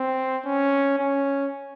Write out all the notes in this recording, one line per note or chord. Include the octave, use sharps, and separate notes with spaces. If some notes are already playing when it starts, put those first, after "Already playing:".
Already playing: C4
C#4
C#4